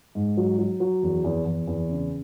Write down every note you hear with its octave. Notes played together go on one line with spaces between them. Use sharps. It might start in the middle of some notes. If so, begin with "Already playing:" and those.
G#2
F#3
F#3
F#3
E2
E2
E2
E2
C#3